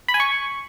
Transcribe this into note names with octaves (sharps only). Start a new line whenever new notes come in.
B5
G#5
C#6